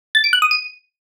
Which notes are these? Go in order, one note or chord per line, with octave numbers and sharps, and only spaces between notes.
A6
D7
F#6
D#6
D#7